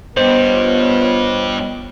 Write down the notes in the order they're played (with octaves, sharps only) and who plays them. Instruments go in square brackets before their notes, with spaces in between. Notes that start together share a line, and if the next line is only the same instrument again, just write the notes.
[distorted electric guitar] G2 G3 [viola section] B3 F4 C#5 [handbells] C5 [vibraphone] D#5 G5